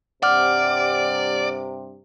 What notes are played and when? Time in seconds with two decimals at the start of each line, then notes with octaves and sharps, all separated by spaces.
0.23 G2 C3 D5 F#5 D6 F6